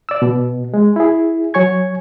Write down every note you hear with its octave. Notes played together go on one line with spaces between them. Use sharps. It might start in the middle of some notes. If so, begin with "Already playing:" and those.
D5 E6
B2
G#3
E4 G#4
F#3 C#5 G#5 C#6 G#6